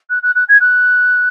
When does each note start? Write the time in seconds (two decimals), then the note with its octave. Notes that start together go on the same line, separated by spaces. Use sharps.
0.10 F#6
0.23 F#6
0.36 F#6
0.49 G#6
0.61 F#6